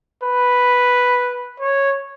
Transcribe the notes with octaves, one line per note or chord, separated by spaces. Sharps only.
B4
C#5